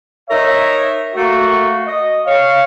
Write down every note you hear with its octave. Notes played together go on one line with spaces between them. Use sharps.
D#4 A#4 C#5 E5
A3 A#3 F#4
D#5
C#5 F5